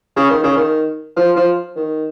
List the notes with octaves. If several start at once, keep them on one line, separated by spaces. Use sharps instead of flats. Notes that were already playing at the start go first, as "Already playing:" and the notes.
C#3
D#3
C#3
D#3
F3
F3
D#3